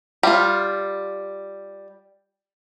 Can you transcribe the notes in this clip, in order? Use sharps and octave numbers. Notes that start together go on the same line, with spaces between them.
G3 F4